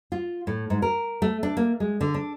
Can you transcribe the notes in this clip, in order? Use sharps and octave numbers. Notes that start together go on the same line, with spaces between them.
F4
A2
G#2
A#4
A3
D4
A#3
G#3
D3
D4